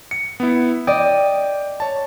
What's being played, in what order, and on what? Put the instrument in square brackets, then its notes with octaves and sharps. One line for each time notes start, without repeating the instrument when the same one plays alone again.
[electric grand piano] C#7
B3 E4
[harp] D5 D#5 [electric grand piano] G5
[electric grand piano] C#5 A5